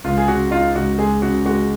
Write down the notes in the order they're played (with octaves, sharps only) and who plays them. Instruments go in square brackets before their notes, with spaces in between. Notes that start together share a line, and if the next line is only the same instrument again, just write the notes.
[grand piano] C#2 [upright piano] F4
[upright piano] G#4
[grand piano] C#3 [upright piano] F#4
[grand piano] D#4 [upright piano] F4
[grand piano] C#2 [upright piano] F#4
[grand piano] G#3 [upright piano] G#4
[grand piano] C#3 [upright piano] F#4
[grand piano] G#3 [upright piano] F#4